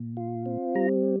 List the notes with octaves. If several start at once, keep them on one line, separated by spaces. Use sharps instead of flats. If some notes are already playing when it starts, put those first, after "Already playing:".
Already playing: A#2
F4
C4
G3 A#5